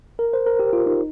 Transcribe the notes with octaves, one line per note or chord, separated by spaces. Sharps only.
A#4
C5
A#4
G4
F4
D#4